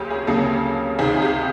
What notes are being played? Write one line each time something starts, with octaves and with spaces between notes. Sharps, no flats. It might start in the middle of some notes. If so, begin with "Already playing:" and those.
Already playing: D2 C#3 F#3 A#3 C#4 G4
G#4
D2 C#3 F#3 A#3 A4
C#2 C3 D#3 G#4
G#4
G4